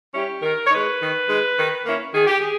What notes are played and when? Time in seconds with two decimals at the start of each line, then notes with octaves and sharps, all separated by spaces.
0.14 G3 C#4 E4 G4
0.42 D#3 A#4
0.66 C#5
0.71 G#3 D#4 B4
1.01 D#3
1.29 G#3 D#4
1.58 D#3
1.86 A#3 C#4 E4
2.14 D#3 G#4
2.27 G4
2.39 G#4